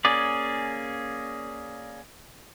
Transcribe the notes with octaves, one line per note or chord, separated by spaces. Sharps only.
A#3 C#4 G#4 D5